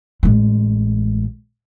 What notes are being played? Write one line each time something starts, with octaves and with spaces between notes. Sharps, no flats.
A1 G#3